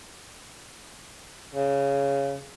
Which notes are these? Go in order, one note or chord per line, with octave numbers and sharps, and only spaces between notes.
C#3